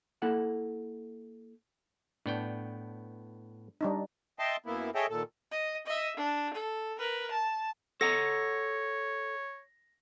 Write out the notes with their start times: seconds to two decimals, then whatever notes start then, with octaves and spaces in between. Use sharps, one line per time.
0.22 A#3 E4 A4 F#5
2.26 A2 B3 D4 G5
3.81 G3 D4 D#4
4.39 D#5 E5 G5 A5 C6
4.66 F#2 A#3 B3 E4
4.95 G#4 A4 C#5 D#5 E5 G5
5.10 D#2 A#2 A4
5.51 D#5
5.87 D#5 E5
6.17 D4
6.54 A4
6.99 A#4 B4
7.31 A5
8.01 A4 C#5 F#5 A#5 A#6